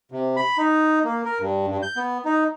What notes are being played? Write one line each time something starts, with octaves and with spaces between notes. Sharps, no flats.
C3
B5
D#4
A#3
A#4
G2
G2
G6
B3
D#4